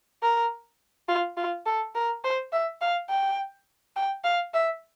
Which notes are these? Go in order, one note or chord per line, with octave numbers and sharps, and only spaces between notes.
A#4
F4
F4
A4
A#4
C5
E5
F5
G5
G5
F5
E5